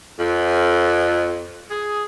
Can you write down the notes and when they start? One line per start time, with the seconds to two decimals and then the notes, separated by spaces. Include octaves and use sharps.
0.19 F2
1.71 G#4